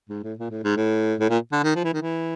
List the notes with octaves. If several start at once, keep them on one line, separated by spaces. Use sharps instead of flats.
G#2
A2
A#2
A2
G#2
A2
A2
A#2
D3
D#3
F3
E3
D#3
E3